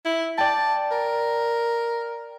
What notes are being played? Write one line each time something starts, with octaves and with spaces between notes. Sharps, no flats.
E4
D5 G5 A5
A#4